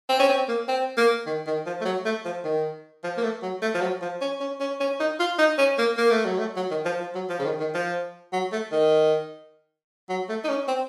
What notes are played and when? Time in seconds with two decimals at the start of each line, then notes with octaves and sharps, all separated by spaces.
0.09 C4
0.20 C#4
0.29 C4
0.48 A#3
0.68 C4
0.97 A#3
1.26 D#3
1.47 D#3
1.67 F3
1.81 A3
1.85 F#3
2.05 A3
2.25 F3
2.44 D#3
3.04 F3
3.17 A#3
3.23 A3
3.42 F#3
3.62 A3
3.75 F3
3.81 F#3
4.02 F3
4.21 C#4
4.40 C#4
4.60 C#4
4.80 C#4
5.00 D#4
5.20 F4
5.38 D#4
5.58 C#4
5.78 A#3
5.97 A#3
6.11 A3
6.25 F#3
6.39 A3
6.56 F#3
6.71 D#3
6.85 F3
7.00 F3
7.15 F#3
7.29 F3
7.39 C#3
7.45 D#3
7.59 D#3
7.74 F3
8.33 F#3
8.52 A3
8.72 D#3
10.09 F#3
10.29 A3
10.44 D#4
10.49 C#4
10.68 C4